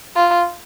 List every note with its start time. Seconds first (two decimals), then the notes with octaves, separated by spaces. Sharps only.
0.16 F4